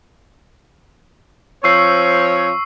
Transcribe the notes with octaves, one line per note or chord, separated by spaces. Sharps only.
F3 C4 C#5 C#6 E6 C7